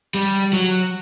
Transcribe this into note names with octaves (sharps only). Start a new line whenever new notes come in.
G3
F#3